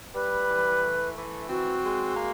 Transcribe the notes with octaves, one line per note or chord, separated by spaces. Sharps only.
G3 B4
E3
A3
E3
C4 F#4
G#3
A#3